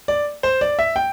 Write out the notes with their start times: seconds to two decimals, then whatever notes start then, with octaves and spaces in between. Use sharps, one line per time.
0.08 D5
0.43 C5
0.61 D5
0.79 E5
0.96 G5